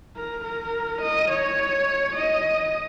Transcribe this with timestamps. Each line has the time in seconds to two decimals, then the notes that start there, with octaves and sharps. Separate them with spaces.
0.16 A#4
0.45 A#4
1.02 D#5
1.31 C#5
2.16 D#5